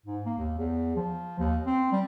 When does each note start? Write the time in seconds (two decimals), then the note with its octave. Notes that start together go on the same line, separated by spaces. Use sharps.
0.06 G#2
0.26 A#3
0.38 D#2
0.58 E2
0.96 F3
1.39 D#2
1.66 C4
1.92 G3